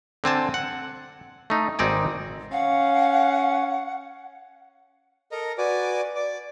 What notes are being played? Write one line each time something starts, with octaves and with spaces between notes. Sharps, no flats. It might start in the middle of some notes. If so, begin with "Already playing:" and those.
D3 C4 G#5 A5
F#5
A3 D#4
G#1 C4 D#4 D5 G#5
C#4 F5 F#5
A4 A#4 D#5 A#5
F#4 B4 D5 G#5 D6
D5 D6